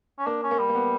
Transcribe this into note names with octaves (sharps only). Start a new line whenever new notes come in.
C#4
A#3 D4
C#4
A#3
G3
A#3
B3